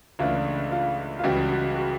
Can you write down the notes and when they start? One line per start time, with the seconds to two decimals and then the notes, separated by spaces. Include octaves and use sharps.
0.19 C#2 C#3 E3 A3 D4 F4
0.72 F4
1.19 F4
1.24 C#2 C#3 E3 G3 F#4
1.51 F#4
1.76 F#4